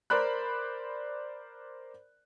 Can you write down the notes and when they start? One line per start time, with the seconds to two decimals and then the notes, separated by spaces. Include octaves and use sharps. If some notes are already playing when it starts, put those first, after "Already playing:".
0.10 A#4 C5 D5 B5 F#6